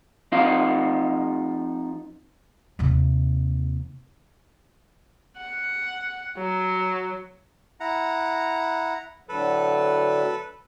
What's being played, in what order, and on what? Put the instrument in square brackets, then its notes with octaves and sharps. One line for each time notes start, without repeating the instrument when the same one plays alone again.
[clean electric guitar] F3 C4 D#4 F5
[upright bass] D#2 C3
[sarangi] F#5
F#3
[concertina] E4 F#5 A#5
[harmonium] A2 D3 F#3 [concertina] A4 B4